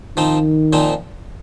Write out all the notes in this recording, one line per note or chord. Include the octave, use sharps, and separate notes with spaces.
D#3 F3 C4 D#4
A#2 F3 C4 D#4